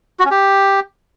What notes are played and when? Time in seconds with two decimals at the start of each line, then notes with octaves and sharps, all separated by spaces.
0.20 F#4
0.25 C#4
0.31 G4